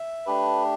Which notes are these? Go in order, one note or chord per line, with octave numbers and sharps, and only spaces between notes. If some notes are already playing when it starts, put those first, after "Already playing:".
Already playing: E5
A3 D4 G4 B4